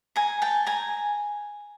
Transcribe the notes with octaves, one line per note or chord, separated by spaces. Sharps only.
G#5 A#5
G5 A5
G#5 A#5